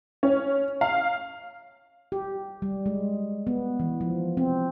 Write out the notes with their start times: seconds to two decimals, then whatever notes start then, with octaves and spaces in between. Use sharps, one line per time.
0.23 C#4
0.81 F5
2.12 G4
2.62 G3
2.86 G#3
3.47 B3
3.80 E3
4.01 F3
4.37 C4